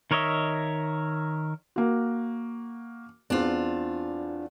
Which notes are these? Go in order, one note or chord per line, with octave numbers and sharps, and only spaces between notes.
D#3 A#4 C#5 D#5 E5
A#3 F#4
E2 C4 D4 F4